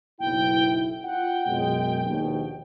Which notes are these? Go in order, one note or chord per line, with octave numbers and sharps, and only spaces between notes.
F#1 B1 E4 G5
F4 F#5 G5
F#2 B2 G#3
A#1 D#2 B2